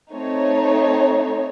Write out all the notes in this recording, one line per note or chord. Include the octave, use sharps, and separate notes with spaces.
A3 C4 D#4 C#5